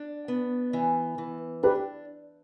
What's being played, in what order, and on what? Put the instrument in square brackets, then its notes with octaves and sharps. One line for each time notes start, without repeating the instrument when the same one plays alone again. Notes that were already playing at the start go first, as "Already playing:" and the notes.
Already playing: [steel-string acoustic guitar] D4
B3
E3
E3
[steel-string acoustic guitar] D4 [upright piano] G4 B4